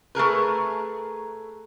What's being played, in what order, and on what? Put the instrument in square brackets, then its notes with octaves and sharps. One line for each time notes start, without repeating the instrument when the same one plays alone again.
[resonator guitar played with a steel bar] A3 G#4 A#4 B4